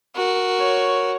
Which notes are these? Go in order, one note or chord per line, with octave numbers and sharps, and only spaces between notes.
F#4 A#4
C#5